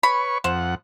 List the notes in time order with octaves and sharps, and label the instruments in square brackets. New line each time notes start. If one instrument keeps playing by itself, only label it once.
[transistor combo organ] B4 C#5 C#6 [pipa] B5
[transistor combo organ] F2 F#5 [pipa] C5